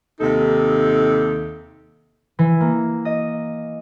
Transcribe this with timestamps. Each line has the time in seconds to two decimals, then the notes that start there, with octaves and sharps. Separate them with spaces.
0.21 D#2 C3 D#4 A4
2.39 E3
2.61 A#3
3.05 D#5